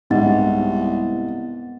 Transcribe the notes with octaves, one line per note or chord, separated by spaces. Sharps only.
C2 G#2 B3 F#5 A6